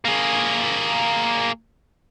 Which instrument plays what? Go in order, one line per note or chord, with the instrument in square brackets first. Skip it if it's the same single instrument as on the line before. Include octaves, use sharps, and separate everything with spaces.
[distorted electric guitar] A#3 G#4